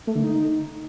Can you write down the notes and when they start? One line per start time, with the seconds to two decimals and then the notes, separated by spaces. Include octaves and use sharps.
0.07 A3
0.15 D3
0.24 D#4